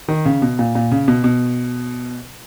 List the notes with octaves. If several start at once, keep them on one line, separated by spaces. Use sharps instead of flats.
D#3
C#3
B2
A#2
A#2
C#3
B2
B2